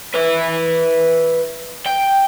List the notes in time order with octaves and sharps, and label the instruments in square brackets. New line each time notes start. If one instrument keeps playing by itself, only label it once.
[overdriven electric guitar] B4 E5
G5